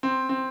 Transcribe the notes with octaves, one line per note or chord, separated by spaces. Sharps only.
C4
C4